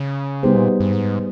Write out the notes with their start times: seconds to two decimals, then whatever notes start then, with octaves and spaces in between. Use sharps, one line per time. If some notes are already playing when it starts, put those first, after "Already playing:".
Already playing: C#3
0.43 C3 G3 B3 D#4 G#4 C5
0.55 A#2
0.80 G2
0.93 G#2